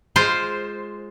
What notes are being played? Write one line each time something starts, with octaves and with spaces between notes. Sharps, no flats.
G#3 F4 C5